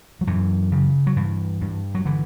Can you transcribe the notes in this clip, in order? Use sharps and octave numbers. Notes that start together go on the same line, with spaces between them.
F#3
F#2 E3
C#3
F#3
G2 E3
G2
F#3
D3 E3